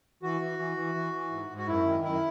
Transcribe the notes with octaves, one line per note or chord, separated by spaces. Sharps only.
E3 F#4
E3
E3
E3
E3
E3
G#2
G#2
F#4
F#2 E4
D#3
F#2 E4